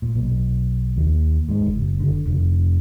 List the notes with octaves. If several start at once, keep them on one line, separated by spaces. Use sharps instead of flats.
A#2
B1
D#2
G#2
F#1
D3
F1